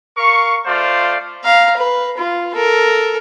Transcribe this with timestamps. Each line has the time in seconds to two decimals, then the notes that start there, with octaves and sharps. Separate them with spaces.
0.17 A#4 F5 C#6
0.66 A3 F4 C5 D5 F5
1.44 F5 A#5
1.77 B4
2.18 F4
2.55 A4 A#4